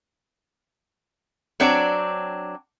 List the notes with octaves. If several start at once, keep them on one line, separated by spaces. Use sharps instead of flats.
F#3 C4 D4 C#5 D5